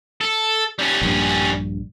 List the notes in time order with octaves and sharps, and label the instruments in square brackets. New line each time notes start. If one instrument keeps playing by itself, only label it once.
[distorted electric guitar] A4
G3 C#4
[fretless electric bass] A#1 G2